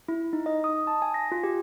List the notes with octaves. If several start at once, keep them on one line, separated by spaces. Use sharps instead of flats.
E4
D#4
D#5
D#6
A5
G#5
A#6
F4
G4